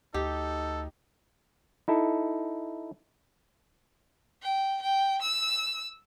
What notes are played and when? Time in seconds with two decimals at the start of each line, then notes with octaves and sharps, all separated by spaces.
0.14 D2 D#4 G4 A4
1.88 D#4 E4 A4
4.42 G5
4.82 G5
5.22 E6